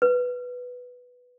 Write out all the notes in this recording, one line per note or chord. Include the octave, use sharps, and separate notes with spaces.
B4